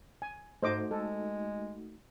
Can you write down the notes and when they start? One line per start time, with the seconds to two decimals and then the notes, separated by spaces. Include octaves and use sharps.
0.22 G#5
0.63 G#2 A3 D#4 F#4 C5 D#5 D6
0.91 G#3 A4